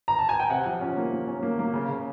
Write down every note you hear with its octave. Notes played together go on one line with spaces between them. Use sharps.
A#5
A5
G#5
G5
C3 F#5
F3
C#4
A#3
A#3
C#4
A#3
A#3
C#3
C#3